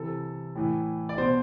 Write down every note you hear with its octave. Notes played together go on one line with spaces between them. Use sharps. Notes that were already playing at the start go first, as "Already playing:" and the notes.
Already playing: C3 E3 A4
A2 E3
D5
B2 C5